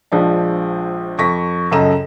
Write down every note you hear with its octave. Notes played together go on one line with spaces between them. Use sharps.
A#1 F3 G#3 D4
F2 C#6 A#6 B6
C#2 F#2 A4 D#5 A#5 E7